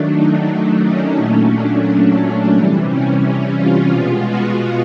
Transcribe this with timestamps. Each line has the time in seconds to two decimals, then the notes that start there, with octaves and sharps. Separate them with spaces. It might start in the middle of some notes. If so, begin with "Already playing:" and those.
Already playing: D#3 F#3 A3 D4
0.14 D#4
0.48 D4
0.83 C#4
1.17 A#2 F#3 A3
1.51 D4
2.54 C3 E3 G3
2.88 C#4
3.56 F4
3.90 B2 G#3 B3
4.25 F#4